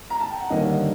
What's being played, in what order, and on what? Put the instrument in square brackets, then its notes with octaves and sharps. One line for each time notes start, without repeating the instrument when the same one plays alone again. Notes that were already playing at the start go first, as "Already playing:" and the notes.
[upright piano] A#5
A5
G5
F#5
D#2 D3 G3 A#3 D4 D#5